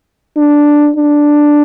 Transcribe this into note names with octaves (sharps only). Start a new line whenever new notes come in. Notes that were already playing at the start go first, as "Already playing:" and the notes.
D4
D4